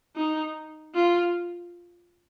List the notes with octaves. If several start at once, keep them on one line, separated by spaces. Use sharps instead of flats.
D#4
F4